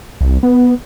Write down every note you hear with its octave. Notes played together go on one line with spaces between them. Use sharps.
C2
B3